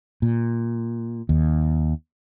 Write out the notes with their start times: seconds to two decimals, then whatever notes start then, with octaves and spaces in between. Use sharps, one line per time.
0.22 A#2
1.29 D#2